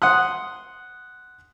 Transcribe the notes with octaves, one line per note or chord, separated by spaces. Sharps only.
F#5 C6 D#6 F#6